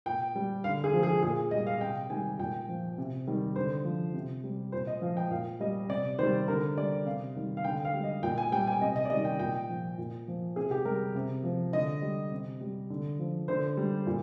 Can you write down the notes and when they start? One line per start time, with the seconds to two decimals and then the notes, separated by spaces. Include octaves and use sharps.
0.06 A#2 G5
0.35 G3
0.64 D3 F5
0.84 G#4
0.93 F3
1.03 G#4
1.23 A#2 G#4
1.51 G3 D#5
1.67 F5
1.81 C3 G5
2.10 D#3 G3 G#5
2.39 A#2 G5
2.69 F3
2.98 C3
3.27 D#3 G3
3.56 D3 C5
3.85 F3
4.14 C3
4.44 G3
4.72 A#2 C5
4.87 D#5
5.02 F3 F5
5.17 G5
5.31 A#2 F5
5.60 G3 D#5
5.89 C3 D5
6.19 D#3 C5
6.23 G3
6.48 D3 A#4
6.77 G3 D5
7.06 C3 F5
7.36 D#3 G3
7.57 F5
7.64 D3 G5
7.85 F5
7.94 G3
8.04 D#5
8.23 A#2 G5
8.38 G#5
8.52 G3 G5
8.67 G#5
8.81 C3 D#5
8.96 D#5
9.05 D5
9.10 D#3 G3 D#5
9.25 G5
9.39 A#2 G5
9.69 F3
9.98 A#2
10.28 F3
10.56 C3 G#4
10.71 G4
10.85 G3 A#4
11.15 C3
11.44 F3
11.73 D3 D#5
12.02 G3
12.32 C3
12.61 G3
12.90 D3
13.19 F3
13.48 D3 C5
13.77 G3
14.07 A#2